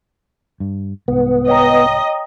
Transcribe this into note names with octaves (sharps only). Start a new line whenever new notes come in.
G2
C2 G#2 B3
C#5 D#5 G5 A#5